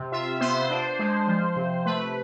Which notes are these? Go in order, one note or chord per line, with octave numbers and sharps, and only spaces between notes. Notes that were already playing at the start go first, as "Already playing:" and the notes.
Already playing: C3
F4 E5
B3 C5
D4
G#3
F3
C3
A3 B4